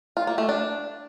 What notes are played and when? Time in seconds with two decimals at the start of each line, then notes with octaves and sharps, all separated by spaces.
0.17 F4
0.27 A#3
0.38 A3
0.49 D4